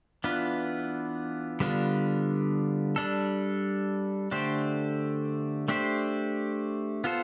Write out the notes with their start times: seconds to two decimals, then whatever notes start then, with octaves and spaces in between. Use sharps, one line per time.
0.24 E3 B3 D4 F4 B4
1.60 D3 G3 B3 D4 F4
2.96 G3 D4 A4
4.31 D3 A3 D4 G4 C5
5.68 A3 D4 G4 C5
7.04 B3 F4 A4 C5